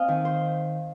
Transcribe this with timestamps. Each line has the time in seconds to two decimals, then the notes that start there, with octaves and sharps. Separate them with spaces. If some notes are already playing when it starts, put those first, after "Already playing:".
Already playing: C4 D#5 F5 G#5
0.08 D#3
0.25 C5